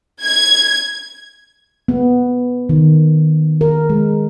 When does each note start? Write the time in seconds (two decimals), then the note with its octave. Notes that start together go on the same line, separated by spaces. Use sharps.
0.22 G#6
1.88 B3
2.69 D#3
3.61 A#4
3.90 G#3